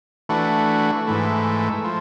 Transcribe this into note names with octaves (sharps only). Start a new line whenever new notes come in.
E3 A3 D4 F#4
G#2 E3 A3
F3